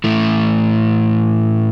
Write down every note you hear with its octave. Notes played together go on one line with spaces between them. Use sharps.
A2 E3 A3